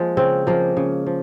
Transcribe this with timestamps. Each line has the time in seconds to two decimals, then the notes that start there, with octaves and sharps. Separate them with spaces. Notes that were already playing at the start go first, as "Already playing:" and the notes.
Already playing: F3 G#3 A#3
0.17 C#3 C4
0.47 F3 G#3 A#3
0.77 C#3
1.07 F3